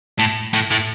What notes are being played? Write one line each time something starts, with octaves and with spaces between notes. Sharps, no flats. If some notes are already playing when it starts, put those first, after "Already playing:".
A2
A2
A2